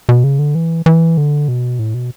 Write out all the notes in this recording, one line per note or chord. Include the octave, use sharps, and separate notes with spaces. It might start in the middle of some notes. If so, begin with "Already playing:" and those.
B2
C#3
D3
E3
E3
D3
B2
A2
B2